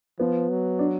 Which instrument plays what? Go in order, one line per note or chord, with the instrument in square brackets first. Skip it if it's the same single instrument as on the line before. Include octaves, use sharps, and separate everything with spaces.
[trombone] F3 [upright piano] B3
[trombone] F#3
[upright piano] D4